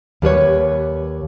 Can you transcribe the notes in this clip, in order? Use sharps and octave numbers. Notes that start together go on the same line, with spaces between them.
D#2 G3 B4 C#5